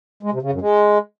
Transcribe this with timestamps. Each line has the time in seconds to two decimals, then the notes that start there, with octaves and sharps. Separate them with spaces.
0.23 G#3
0.32 C3
0.42 C#3
0.52 F#2
0.61 G#3